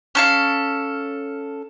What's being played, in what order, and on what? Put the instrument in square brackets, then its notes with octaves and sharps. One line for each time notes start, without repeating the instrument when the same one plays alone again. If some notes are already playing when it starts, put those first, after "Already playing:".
[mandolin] C#4 A4 F5